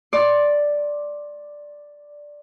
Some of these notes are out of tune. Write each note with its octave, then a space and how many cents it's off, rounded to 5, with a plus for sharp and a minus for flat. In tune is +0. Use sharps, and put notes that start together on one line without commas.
D5 +0 C6 +25